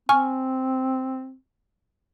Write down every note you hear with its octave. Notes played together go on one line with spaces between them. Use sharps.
C4 G#5 C#6 F6